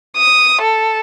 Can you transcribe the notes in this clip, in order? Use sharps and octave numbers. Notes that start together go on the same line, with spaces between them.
D#6
A4